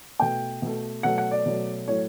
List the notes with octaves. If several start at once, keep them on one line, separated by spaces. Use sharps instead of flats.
B2 A3 G5
B2 A3
B2 F#3 A3 F#5
F#5
D5
B2 F#3 A3
A2 F#3 A3 C#5